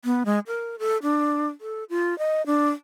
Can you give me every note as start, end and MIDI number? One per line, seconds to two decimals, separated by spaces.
0.05 0.23 59
0.25 0.39 56
0.47 0.76 70
0.79 0.97 69
1.03 1.47 62
1.61 1.84 69
1.90 2.17 65
2.19 2.45 75
2.46 2.70 62